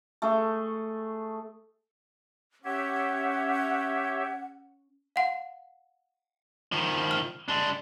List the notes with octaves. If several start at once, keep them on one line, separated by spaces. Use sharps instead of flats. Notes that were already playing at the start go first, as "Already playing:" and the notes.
A3 G#4
C#4 G4 C#5 E5 F#5
F5 F#5
D#3 F3
F6
G#3 D4